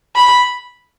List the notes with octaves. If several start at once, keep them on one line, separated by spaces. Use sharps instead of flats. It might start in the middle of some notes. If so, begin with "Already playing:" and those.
B5